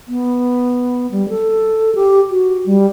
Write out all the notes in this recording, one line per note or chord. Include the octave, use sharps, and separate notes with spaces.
B3
G3
A4
G4
F#4
G3